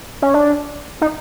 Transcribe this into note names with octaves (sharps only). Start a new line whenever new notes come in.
C#4
D4
D#4